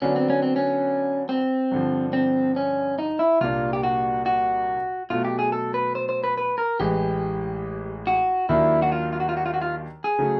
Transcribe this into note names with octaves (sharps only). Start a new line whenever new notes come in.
D3 F#3 B3 C#4 D4
C4
C#4
C4
C#4
C4
G2 D3 F3
C4
C#4
D#4
E4
C2 A#2 G3 A#3 D4 F4
G4
F#4
F#4
B2 F#3 A3 F4
G4
G#4
A4
B4
C5
C5
B4
B4
A#4
A1 A2 E3 G#3 G4
F#4
D#2 D#3 F#3 A#3 D4 E4
F#4
F4
F4
F#4
F4
F#4
F4
F#4
F4
G#4
C#3 F#3 A3